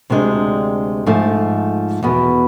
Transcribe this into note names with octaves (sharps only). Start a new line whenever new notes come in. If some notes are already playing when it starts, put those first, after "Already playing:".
D2 C3 G#3 D4
G#2 F3 A3
E2 B2 B3